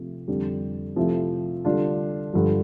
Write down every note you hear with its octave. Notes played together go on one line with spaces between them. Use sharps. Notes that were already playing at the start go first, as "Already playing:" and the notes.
Already playing: C3 F3 A3
F2 D3 G3 D4
C3 F3 A3 C4 E4
D3 G3 D4 F4
G2 D3 F3